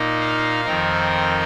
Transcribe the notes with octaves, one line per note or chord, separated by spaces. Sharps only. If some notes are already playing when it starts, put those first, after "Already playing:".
Already playing: A#2 A#3 D#4
F5
F2 D#3 C4 D#4 A#4